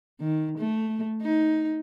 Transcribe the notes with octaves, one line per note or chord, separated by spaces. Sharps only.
D#3
A3
D#4